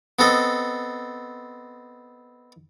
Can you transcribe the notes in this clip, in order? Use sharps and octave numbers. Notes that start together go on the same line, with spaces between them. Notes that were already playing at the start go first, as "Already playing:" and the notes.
B3 C4 A4 D#5